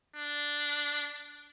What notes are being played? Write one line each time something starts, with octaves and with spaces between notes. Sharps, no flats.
D4